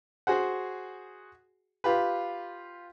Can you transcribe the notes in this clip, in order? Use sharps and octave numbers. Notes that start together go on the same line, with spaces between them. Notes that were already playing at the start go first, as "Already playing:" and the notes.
F#4 G#4 C5 F#5
F4 G4 B4